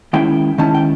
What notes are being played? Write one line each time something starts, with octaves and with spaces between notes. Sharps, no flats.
D#3 G#3 C#4 E4 G5
D#3 G#3 C#4 E4 A5
G5